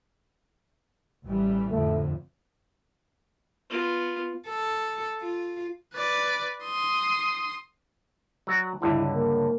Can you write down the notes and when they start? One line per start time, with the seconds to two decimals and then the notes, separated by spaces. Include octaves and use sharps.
1.26 A1 E3 G3
1.72 F2 A2 D3 A3
3.70 B3 F4
4.48 A4
5.21 F4
5.95 B4 D5
6.64 C6 D#6
8.47 F#3 F#4 D5
8.82 C#2 G2 D3 E4
9.14 A#3